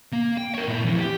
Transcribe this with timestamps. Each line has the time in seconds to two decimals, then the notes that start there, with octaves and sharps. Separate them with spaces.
0.13 A#3
0.38 G5
0.54 A#4 C#5
0.68 A#2 E4
0.85 F2 E3
1.00 G4